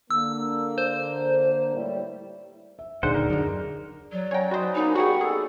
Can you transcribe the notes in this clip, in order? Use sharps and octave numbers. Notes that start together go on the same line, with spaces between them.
D3 A#3 E6
C5
A2 G3 E4
E5
D#1 D3 D#4 G#4 C5 D5 F#5
A#4
F#2 D3
F#3 D5
C#4 C#5 F#5 G5 A#5
D#4 F#4 B4 C5
A#3 B3 C#4 D#4
G3 F#4 G#4 F#5 C#6
G#4 A4